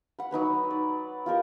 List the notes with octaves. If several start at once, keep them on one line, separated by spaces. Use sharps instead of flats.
F#5 B5
F#3 D#4 B4 C#5
D5
F4 G4 A#4 D#5